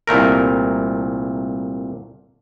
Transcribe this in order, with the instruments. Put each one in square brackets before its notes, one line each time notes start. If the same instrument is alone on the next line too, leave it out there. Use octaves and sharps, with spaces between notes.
[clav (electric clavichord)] C2 A#2 A3 A#4